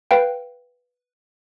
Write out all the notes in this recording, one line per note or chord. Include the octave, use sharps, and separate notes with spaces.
B4 F5 G5